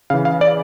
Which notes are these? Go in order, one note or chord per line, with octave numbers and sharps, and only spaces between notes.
C#3 E3 F5
F5
D5